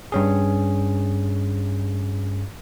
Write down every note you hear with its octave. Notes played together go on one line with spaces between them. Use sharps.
G2 C#4 G#4